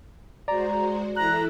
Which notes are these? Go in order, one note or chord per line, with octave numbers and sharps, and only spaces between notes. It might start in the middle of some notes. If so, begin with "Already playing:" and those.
G#3 F#4 C5 D5 A#5
E3 E4 A4 A#5 F#6